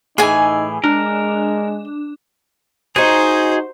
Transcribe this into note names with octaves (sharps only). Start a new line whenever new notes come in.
A2 E3 D#4 G#4 G#5
G#3 D4 A#4
D#4 F#4 G#4 C5 G#5